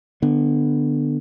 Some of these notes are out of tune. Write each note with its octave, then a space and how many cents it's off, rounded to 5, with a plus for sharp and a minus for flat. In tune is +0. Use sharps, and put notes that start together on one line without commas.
D3 +15 B3 +0